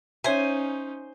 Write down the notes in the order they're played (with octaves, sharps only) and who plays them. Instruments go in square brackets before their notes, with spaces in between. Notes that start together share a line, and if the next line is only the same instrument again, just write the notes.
[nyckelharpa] C#4 D#4 [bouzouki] C5 G#5 [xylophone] C#5 E5